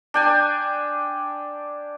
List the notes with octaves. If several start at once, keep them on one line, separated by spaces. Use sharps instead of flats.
D4 G5 G#5